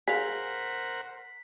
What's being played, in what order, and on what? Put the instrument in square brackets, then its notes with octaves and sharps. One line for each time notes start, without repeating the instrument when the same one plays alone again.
[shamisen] G#4 F5 [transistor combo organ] A#4 C5 F#5 [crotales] B6